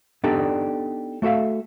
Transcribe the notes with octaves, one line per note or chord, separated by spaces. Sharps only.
B3 D4 D#4 G4 A4 D5
A3 F#4 A4 E5 F5